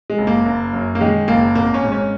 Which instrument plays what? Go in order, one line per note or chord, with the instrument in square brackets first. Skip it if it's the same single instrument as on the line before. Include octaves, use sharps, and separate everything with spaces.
[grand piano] G#3
F#1
A#3
F#1
F#2
A#3
D#3 G#3
F#1 A#3
G#1 A#3
C#4
G#2
C#4